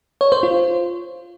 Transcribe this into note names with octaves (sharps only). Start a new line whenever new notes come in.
C#5
C5
F4